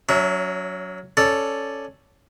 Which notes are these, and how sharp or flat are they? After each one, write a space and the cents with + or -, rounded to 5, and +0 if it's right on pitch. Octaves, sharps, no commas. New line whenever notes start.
F#3 +0 C#4 +40 E5 +0
C#4 +0 A4 +0 D5 +0